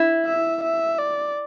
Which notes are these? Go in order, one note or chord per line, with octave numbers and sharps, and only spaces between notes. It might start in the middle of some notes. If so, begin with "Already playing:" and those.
Already playing: E4
E5
E5
D5